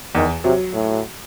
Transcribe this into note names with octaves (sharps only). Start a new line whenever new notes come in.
E2 D#3
C3 F#3
A2